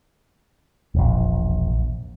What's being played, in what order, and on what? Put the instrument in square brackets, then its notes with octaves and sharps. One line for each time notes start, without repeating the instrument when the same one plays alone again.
[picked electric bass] E1 A#1